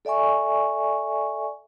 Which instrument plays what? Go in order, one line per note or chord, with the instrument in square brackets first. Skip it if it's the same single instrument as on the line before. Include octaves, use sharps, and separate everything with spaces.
[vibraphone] A4 D5 E5 G#5 C#6